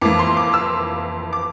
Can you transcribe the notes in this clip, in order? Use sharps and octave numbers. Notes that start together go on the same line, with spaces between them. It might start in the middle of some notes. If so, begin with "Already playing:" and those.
F2 E3 A#3 D6
C6
D6
E6
D6